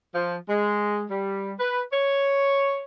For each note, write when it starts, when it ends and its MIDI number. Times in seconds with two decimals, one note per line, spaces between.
0.15 0.35 53
0.49 1.04 56
1.10 1.53 55
1.59 1.81 71
1.92 2.83 73